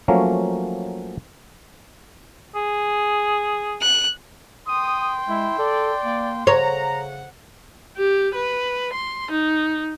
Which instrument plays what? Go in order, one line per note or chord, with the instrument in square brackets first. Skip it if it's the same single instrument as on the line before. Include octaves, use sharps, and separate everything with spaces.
[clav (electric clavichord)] F3 F#3 A3 A#3 C#4
[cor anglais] G#4
[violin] F#6
[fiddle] G5 C6 [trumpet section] D#6
[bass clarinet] G#3 [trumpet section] E4
[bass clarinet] A4 [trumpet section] D5
[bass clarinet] A#3
[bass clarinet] C#3 [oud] C#5 [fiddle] F#5 [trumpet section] A#5
[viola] G4
B4
C6
D#4